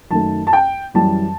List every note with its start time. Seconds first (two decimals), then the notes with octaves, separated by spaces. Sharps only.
0.11 F#2 D#3 F#3 A3 A5
0.47 A5
0.53 G5
0.94 F#2 E3 G3 A5